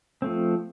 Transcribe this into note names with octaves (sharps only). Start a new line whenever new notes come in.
F3 A3 C4